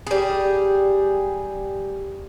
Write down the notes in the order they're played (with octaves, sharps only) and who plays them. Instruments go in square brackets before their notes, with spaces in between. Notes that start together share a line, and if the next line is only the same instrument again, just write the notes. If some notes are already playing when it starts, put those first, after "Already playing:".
[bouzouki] G3 G#4